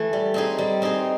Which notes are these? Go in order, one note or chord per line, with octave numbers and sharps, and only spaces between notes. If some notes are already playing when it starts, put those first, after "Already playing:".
Already playing: E3 A3
G3
C4 D#4 G#4
G3
C4 D#4 G#4